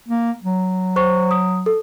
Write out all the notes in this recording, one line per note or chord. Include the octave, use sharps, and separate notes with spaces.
A#3
F#3
C5 C#6
D#6
A4